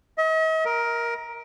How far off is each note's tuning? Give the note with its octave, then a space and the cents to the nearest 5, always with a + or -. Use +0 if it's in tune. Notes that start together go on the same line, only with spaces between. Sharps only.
D#5 +45
A#4 +10